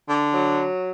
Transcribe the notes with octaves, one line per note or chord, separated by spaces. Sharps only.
D3
F#3